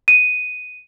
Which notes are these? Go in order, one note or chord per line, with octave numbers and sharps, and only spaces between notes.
D#7